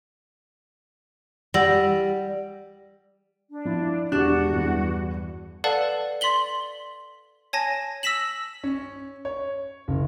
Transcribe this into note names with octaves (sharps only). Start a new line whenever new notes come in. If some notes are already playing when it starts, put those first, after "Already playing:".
G3 F#5 E6 A#6
D4
F3 E4
E1 D4 F#4 G4 F#6 E7
E2 G2 E3
A4 B4 D5 F5 F#5 A5
D5 C6 B6 F#7 G7
C#5 G#5 A5 A#6
E6 A#6 B6 E7 F#7
C#4
C#5
F#1